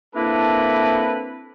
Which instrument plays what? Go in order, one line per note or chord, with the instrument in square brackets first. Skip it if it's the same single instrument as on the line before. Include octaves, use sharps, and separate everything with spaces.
[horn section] A#3 C4 D4 E4 A4 B4